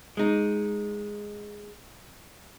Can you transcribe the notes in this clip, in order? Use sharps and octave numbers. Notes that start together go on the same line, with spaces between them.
G#3 D#4